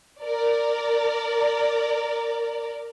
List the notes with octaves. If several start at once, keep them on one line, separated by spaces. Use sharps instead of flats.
A#4 D5